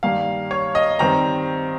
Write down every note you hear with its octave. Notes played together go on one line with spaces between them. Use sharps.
G2 D#3 G3 A#3 F5
C#5
D#5
D#3 G3 C4 A#5